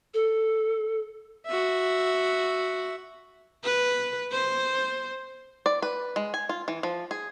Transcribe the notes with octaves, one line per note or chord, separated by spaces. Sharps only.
A4
F#4 E5
B4
C5
D5
B4
G#3
G#5
F4
E3
F3
G#4